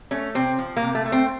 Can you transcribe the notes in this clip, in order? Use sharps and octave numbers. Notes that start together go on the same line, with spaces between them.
A3 C#4
C3 C4
F3
A#3
C3
A3
A3
C4